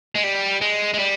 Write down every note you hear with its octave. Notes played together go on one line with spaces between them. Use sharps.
G#3
G3
G#3
G#3
G3